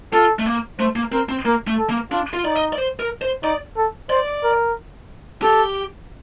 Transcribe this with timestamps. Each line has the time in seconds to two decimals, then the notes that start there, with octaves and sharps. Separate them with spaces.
0.13 F4 A4
0.39 A3
0.46 A#3
0.79 A3 C5
0.96 A#3
1.12 C4 A#4
1.29 C4
1.46 A#3 A#4
1.67 A3
1.78 A4
1.89 A#3
2.11 D4 F4
2.33 F4
2.45 D#4 D5
2.56 D#5
2.73 D5
2.78 C5
3.00 A#4
3.22 C5
3.43 D#4 D5
3.77 A4
4.10 C5 D5
4.44 A#4
5.42 G4 A4